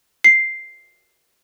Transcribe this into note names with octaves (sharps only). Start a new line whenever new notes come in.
C7